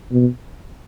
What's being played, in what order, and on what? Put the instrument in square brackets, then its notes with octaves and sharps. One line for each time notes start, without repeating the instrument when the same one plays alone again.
[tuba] B2